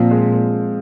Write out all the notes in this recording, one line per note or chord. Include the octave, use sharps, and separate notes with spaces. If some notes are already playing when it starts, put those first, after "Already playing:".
Already playing: A#2 F3 C4
G#3